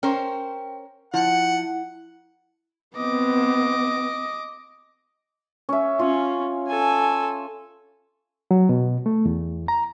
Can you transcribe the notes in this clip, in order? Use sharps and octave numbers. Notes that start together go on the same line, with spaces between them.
C#4 A#4 C5 G5
F3 E4 F#5
B3 C4 D#5 D6
C#4 E5
C#4 F4
A4 G#5
F#3
B2
A3
E2
A#5